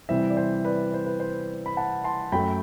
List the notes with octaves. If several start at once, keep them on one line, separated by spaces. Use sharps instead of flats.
C3 E3 G3 C5 E5
D5
C5 E5
B4 D5
C5
B4
C5
B5
F#5 A5
A5 C6
F#2 F#3 A3 G5 B5